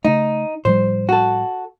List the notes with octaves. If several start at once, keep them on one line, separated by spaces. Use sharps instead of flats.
C#3 A3 D#4
A2 F3 G3 C5
F#4 A4